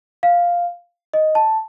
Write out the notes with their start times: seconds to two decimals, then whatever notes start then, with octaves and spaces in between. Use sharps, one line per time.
0.23 F5
1.13 D#5
1.35 A5